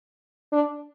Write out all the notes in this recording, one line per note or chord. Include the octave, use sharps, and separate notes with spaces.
D4